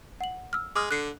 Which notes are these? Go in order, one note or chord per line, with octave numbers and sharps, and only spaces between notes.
F#5 F#7
E6 F6
G#3 D6 D#6 F6
D3 F#6 C7 C#7